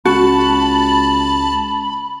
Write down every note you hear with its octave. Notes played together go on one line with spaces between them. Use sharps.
C#2 F#4 A5 B5